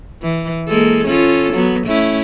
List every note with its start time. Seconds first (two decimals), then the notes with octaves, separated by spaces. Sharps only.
0.22 E3
0.68 G#3 A#3 A4
1.07 C#4 F4 A4
1.54 F#3 B3
1.87 A3 C#4 E4